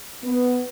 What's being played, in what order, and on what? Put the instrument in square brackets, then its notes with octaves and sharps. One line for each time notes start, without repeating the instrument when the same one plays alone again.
[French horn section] B3